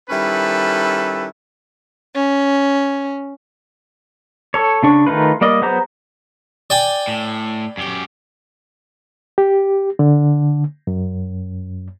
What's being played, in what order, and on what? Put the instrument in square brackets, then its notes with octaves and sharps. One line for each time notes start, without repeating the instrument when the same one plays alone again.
[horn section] D#3 G3 C#4 E4 A4 B4
[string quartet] C#4
[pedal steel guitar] A4 C#5
C#3 D4 C#6
D#3 A3 D#4 F4 B4
G3 A#3 D5 D#5
F#3 B3 G#4 C5 A#5
[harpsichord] D5 G5 G#5
[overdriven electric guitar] A2
F#2 G4
[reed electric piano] G4
D3
F#2